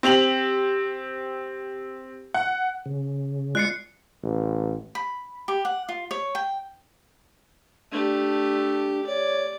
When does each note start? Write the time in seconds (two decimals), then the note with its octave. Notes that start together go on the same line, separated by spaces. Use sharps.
0.03 C4 G4 F7 F#7
2.34 F#5
2.86 C#3
3.55 G#3 F4 D5 F#6 C7 C#7
4.23 A1
4.95 B5
5.48 G4
5.65 F#5
5.89 F4
6.11 C#5
6.35 G5
7.92 A3 D4 G4
9.07 C#5 D5